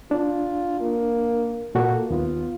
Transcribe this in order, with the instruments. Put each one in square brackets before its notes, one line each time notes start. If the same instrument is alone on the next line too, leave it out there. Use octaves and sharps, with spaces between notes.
[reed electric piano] D4 [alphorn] F4
[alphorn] A#3
[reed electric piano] A#2 F#4 A4 [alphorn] A#3
[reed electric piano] D#2 B3 [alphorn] F4